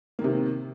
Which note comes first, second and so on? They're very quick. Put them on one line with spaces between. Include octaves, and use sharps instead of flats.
A#3 D#3 C3